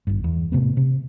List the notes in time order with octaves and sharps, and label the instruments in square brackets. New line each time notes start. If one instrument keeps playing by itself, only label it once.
[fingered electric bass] G#1 G2
E2
A2 C3 A3 B3
C3